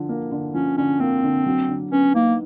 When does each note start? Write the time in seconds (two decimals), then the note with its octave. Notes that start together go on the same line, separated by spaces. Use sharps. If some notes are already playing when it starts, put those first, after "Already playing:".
Already playing: D3 F3
0.09 A#3
0.32 D3
0.54 F3 C#4
0.78 D3 C#4
1.00 A#3 C4
1.23 D3
1.46 F#3
1.69 D3
1.91 B3 C#4
2.15 A#3 D#4